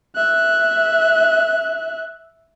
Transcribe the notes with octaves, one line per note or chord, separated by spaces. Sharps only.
E5 F#6